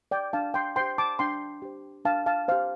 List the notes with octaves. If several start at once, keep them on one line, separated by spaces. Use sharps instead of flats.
D5 G5
D4 F5 A5
G5 C6
G4 C5 G5 C6
A5 D6
D4 G5 C6
G4 C5
D4 F5 A5
F5 A5
G4 C5 F5